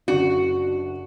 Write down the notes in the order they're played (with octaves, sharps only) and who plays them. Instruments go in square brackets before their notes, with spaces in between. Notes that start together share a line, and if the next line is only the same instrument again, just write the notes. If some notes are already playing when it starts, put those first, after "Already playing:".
[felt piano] F#1 D4 [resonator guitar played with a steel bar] F#4